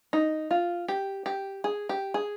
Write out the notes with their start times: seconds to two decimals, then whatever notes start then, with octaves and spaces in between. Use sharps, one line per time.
0.13 D#4
0.51 F4
0.88 G4
1.26 G4
1.64 G#4
1.89 G4
2.14 G#4